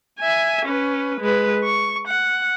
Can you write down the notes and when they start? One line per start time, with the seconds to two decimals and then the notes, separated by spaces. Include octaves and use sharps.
0.20 E5 G#5
0.65 C#4 B4
1.20 G#3 B4
1.64 C#6
2.08 F#5